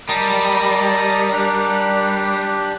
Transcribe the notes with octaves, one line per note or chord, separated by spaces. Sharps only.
G3 A#4 D#5 A5 D#6
D4 G4 F#6